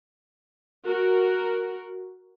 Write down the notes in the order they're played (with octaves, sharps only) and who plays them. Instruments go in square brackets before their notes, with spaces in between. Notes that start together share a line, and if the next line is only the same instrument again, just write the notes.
[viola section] F#4 A#4